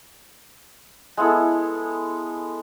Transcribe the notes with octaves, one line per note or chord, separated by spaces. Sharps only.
G#3 B3 E4 A4